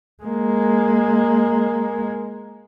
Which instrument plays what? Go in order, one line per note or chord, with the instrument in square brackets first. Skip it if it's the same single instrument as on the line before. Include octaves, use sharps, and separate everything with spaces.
[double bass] G#3 A#3